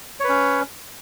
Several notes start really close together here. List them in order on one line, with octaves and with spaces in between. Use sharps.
C#5 B4 C#4